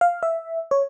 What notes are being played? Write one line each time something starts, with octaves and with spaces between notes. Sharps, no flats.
F5
E5
C#5